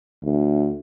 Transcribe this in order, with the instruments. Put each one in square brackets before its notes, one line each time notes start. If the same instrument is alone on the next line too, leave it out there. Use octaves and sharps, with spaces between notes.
[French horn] D2